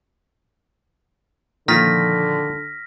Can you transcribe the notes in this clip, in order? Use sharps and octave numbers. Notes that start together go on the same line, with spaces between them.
A#2 D3 D#3 F3 F4 F6 A#6 B6